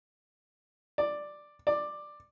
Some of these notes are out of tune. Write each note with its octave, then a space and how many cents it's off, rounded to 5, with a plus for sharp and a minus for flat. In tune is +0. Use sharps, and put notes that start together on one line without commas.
D5 +5
D5 +10